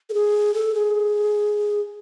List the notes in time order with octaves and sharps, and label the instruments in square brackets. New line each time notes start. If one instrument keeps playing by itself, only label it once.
[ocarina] A4
G#4
A4
G#4